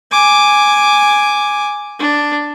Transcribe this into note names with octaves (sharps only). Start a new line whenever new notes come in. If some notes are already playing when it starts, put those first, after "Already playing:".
G#5 D6
D4